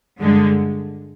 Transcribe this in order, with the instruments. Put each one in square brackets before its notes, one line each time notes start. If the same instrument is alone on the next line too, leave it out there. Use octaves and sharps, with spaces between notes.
[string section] G2 D3 G#3